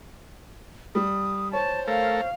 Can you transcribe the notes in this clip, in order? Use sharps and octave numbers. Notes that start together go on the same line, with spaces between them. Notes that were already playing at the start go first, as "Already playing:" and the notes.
G3 D#6
C5 C#5 A5
A3 A4 A#4 F5